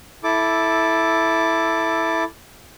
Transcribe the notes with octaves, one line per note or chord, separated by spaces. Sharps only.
E4 A4 D6